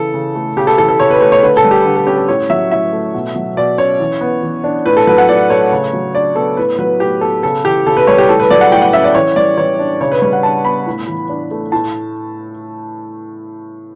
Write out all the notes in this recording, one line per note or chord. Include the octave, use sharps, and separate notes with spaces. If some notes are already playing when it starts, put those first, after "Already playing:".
Already playing: C#3 E3 A4
C#3
A3
C#3 G4
A4
E3 A4
A4
C#3 C#5
B4
A3 C#5
C#5
D3 B4
A4
G3
G4
D3
A4
C#4 G4
A4
A2 C#5
F#3 E5
A2 E5
A3
B2
F#3
B2 D5
C#4 C#5
E3
B3
E3
D4
A2 B4
A4
F#3 B4
F#5
A2 D5
A3 C#5
C#3
F#3
D4 D5
B3 A4
A2 B4
F#3 B4
A2 G4
B3 A4
C#3 A4
E3 G4
C#3 A4
B4
G3 C#5
G4
A2 A4
B4
F#3 D5
F#5
A2 G5
F#5
C#4 E5
D5
E3 C#5
G3 D5
E3 C#5
D4
C#3 C#5
B4
G3 C#5
F#5
D4 A5
B3 B5
A2
E3
D4
A3
A2 A5